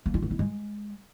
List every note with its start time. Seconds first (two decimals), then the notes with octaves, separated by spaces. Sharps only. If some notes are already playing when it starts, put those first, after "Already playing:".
0.06 A#3
0.14 F4
0.22 B3
0.31 E4
0.39 G#3